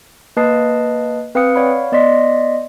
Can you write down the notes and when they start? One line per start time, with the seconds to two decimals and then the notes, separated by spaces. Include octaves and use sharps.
0.37 A#3 B4 D#5 A5 D#6 C7
1.35 C4 B4 F5 G5 D#6 C#7
1.56 C#5 D5 F5 F#5 B5
1.92 B3 D5 D#5 C6 B6